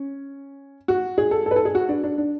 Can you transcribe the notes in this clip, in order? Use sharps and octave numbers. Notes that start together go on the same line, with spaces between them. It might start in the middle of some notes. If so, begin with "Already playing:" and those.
Already playing: C#4
F#4
G#4
A4
A4
B4
A4
G#4
F#4
D4
D4
D4